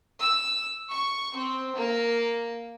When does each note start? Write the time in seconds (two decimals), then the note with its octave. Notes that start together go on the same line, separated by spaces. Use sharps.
0.21 E6
0.91 C#6
1.36 C4
1.75 A#3